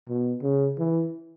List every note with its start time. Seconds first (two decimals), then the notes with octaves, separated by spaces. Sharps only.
0.08 B2
0.42 C#3
0.78 E3